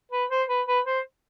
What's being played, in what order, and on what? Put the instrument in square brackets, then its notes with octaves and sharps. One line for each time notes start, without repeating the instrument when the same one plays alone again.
[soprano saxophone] B4
C5
B4
B4
C5